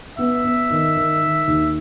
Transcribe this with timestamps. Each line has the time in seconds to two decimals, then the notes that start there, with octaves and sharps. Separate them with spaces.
0.18 B3 E5
0.44 B3
0.70 D#3
0.96 D#3
1.22 D#3
1.48 D#2